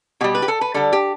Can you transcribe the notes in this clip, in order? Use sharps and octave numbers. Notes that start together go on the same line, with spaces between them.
B2 G3 G4
B4
G4
A4
B4
D3 G3 A4
G4